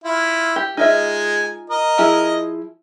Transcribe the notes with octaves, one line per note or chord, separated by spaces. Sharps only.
E4 F4
G4
G#3 D#4 F4 E5 G#5
A#4 D#5
F3 E4 G#4